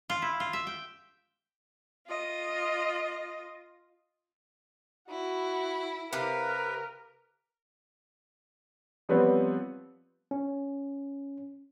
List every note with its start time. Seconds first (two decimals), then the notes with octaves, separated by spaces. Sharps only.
0.10 F4
0.22 E4
0.40 F4
0.53 E5
0.67 G5
2.08 F4 D#5
5.10 E4 F#4
6.13 C3 A#4 B4 F5
9.09 F3 G3 B3 C4 B4 C#5
10.31 C#4